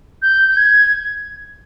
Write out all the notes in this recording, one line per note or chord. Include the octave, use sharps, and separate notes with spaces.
G6
G6
G#6